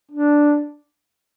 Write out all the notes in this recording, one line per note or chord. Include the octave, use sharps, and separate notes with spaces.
D4